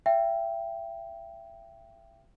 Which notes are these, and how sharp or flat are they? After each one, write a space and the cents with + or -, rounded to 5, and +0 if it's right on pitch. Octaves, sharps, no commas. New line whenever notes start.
E5 +30 G5 +0